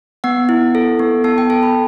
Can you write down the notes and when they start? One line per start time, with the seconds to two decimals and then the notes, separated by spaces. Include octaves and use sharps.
0.24 B3 F#5
0.49 E4
0.75 A4
0.99 B3
1.24 B3 A5
1.38 G5
1.50 A4 A5
1.63 B5